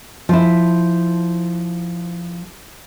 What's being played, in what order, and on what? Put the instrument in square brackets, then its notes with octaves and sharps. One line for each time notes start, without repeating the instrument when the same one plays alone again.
[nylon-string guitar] F3 E4